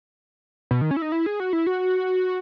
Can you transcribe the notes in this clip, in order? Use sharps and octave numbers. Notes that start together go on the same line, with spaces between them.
B2
D#3
C#4
E4
D#4
E4
G#4
F#4
E4
F#4